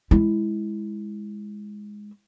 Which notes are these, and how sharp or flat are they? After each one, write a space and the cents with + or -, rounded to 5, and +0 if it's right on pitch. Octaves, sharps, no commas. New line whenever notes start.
G#3 +0 E4 +0